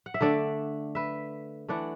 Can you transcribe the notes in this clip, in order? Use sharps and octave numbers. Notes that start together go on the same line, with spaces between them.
F#5
E5
D3 A3 D4 A4 D5
B4 E5
E3 A3 D4 D5 F#5